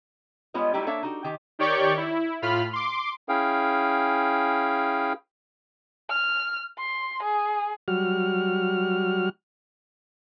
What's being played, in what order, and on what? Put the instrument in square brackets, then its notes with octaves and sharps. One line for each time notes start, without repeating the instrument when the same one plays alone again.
[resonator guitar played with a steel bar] G3 G#3 B3 F4 C#5 D#5
F#3 G3 A3 D#4 E4 G4
A#3 D4 A4 C#5 E5 F5
D#4 F#4 G4
D#3 G4 G#5
[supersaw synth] D#3 G4 C#5 D5 C#6 G6
E4
A2 F4 B5 F6
C6 D6
[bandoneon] C#4 E4 G#4 F5 G5
[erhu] F6
C6
G#4
[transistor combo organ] F#3 G3 F#4 F6